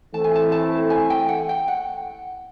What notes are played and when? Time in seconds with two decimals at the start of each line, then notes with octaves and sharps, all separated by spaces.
0.14 E3 A3 C4 E4 A4 A5
0.24 G#5
0.36 A5
0.52 A5
0.90 G#5
1.10 G5
1.29 F#5
1.49 G5
1.68 F#5